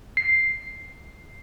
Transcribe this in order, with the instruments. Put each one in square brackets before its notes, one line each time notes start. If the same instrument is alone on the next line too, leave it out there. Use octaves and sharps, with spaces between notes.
[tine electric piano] C7